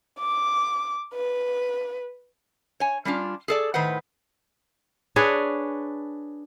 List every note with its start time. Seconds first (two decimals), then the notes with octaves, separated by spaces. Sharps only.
0.19 D6
1.14 B4
2.80 C#5 G#5
3.05 G3 C#4 D4 F4
3.48 G#4 A4 D5
3.74 A2 D#3 B4 C5 F#5
5.16 D4 G#4 B4 C#5